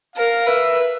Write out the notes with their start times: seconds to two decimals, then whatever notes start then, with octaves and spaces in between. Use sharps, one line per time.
0.16 A#4 F5
0.47 B4 E5